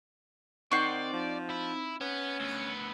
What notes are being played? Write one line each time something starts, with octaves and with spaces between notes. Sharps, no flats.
D#3 C4 D#4 C5 D5 F#5 C#6
F3
E4
B3 C#4 B4
D2 B3 E6 F#6 C#7